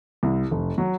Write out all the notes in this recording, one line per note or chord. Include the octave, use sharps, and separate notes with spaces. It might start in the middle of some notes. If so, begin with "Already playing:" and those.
C2
F1
F#3